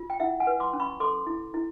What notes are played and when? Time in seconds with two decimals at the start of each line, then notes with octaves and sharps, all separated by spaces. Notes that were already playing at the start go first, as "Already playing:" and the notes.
Already playing: F4
0.10 G5
0.20 E4 E5 F#5
0.40 F#5 G#5
0.47 B4
0.60 C6 D6
0.73 C#4
0.80 B5 C#6
1.00 A4 C6 D6
1.27 E4
1.54 E4